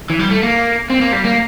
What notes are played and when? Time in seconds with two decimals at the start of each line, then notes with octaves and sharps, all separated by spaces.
0.10 E3
0.19 G3
0.31 A3
0.43 A#3
0.90 C4
1.01 A#3
1.12 G3
1.24 A#3